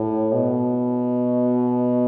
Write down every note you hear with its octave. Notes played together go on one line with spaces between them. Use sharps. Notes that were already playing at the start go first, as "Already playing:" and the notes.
Already playing: A2
B2